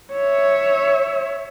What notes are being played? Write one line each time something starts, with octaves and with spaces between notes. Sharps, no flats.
C#5 E5